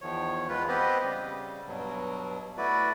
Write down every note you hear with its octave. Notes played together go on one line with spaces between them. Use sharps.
E2 D#3 F3 C#5
E2 G#3 F4 B4
B3 C4 G4 B4 C5 D#5
C#3 G3
G2 B2 F#3
A3 E4 F#4 B4 D5